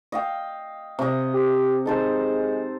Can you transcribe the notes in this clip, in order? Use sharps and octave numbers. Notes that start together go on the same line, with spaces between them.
D#5 F5 G5
C3 D#5
G4
G#3 D#4 A4 C5